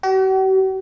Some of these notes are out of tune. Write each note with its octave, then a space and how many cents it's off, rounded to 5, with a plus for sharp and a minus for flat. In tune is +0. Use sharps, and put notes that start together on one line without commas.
F#4 +45